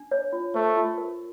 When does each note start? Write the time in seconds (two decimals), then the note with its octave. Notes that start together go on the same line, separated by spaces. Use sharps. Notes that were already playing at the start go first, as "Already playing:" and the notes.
Already playing: D4
0.11 C#5
0.33 F4
0.54 A3 C5
0.77 F4
0.98 A#4